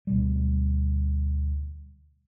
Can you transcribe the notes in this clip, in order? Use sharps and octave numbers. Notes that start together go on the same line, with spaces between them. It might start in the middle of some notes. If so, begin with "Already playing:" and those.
D2 B2 G3